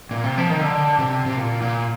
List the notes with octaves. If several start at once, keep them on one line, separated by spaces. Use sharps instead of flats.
A#2
C3
F3
D#3
D3
C3
C3
A#2
A#2